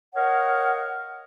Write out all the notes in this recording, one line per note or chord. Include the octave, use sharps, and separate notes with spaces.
A#4 C#5 D#5 F5 F#5